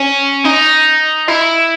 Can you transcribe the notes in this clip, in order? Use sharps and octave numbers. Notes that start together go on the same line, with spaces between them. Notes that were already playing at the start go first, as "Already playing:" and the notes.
Already playing: C#4
D#4
E4